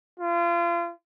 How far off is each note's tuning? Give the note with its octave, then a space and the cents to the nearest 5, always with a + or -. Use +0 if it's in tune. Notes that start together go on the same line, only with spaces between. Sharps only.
F4 -35